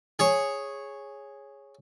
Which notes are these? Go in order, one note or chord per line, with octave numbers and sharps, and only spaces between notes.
G#4 C#5